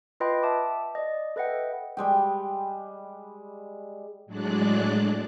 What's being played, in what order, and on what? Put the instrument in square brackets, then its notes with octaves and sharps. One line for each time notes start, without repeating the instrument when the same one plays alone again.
[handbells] F4 B4 D#5 G5 B5 C6
E5 A5 D6
D5 D#5
A4 B4 D#5 E5 F#5 G5
[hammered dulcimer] G3 G#3 G5
[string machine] A2 F#3 G#3 D4 D5 F#6